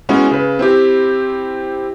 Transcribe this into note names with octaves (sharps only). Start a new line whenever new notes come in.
G#3 B3 C#4 E4 F#4
C#3 B4
C4 E4 G4